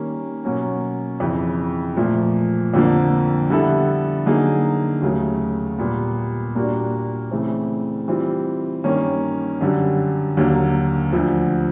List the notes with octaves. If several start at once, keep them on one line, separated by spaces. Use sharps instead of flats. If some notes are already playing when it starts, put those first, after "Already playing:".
Already playing: D#3 G3 A#3 C#4
B2 F#3 A#3 C#4 F#4
F2 C#3 E3
A#2 F3 A3
F2 D3 F3 A#3
D3 G3 B3 E4 A4
D3 F#3 A#3 D#4 G#4
D#2 C#3 F#3 A3
A#2 G3 B3
A#2 G3 A#3 D4 F#4
C#3 E3 A3 C4
E3 G3 C4 F4
G2 D#3 G3 A#3 C#4
F#2 D3 G3
D#2 D3 F#3 A#3
D2 D3 F3